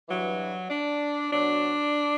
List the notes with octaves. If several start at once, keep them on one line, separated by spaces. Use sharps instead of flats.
G2 E3 F#3
D4
B2 F#3 D4